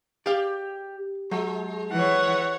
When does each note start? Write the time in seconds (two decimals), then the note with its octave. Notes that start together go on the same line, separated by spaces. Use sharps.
0.26 G4 D5 F5
1.31 F#3 G#3
1.92 E3 C#5 F#5